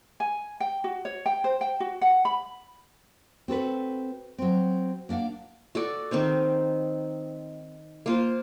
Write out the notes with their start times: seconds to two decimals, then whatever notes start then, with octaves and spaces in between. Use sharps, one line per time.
0.20 G#5
0.60 G5
0.84 F#4
1.05 C#5
1.26 G5
1.44 C5
1.61 G5
1.80 F#4
2.01 F#5
2.25 B5
3.48 C4 F#4 A4 B4
4.38 F#3 C4
5.09 A#3 D4 D#5 F5 F#5
5.75 F#4 A4 D5
6.11 D#3 C4 D#4 C5
8.06 A#3 F4 C5